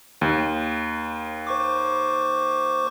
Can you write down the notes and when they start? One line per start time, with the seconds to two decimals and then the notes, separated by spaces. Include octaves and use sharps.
0.21 D#2
1.47 C5 C#6 D6